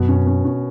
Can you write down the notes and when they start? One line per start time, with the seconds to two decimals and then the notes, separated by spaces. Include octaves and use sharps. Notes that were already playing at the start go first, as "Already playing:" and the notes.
Already playing: F#2 B2
0.09 C#4
0.27 C#4
0.45 C#4